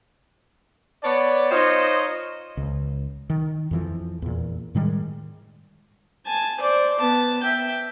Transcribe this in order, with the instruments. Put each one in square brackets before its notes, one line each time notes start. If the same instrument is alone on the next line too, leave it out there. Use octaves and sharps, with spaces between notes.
[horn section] B3 C#5 D5
D#4 F4 C5 C#5 D#5
[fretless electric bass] C#2
D#3
F2 E3 F3
E2 A#2
A2 D#3 G3 G#3
[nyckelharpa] G#5 A5
C5 D5
B3 A5
E5 G5